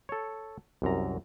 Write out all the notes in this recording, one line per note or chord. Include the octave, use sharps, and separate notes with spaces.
A4 C#5
C2 F#2 A#5